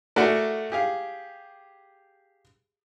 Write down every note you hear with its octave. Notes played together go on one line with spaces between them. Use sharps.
A3 F#4 G#4 A#4 D5 F#5
G4 G#4 F5